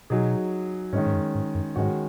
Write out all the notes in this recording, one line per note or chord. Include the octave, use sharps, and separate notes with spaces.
B2 F#3 D#4 G#4
G#2 D#3 G#3 C#4
G#2
F#2
G#2
F#2
G#2 D#3 G#3 C#4 F#4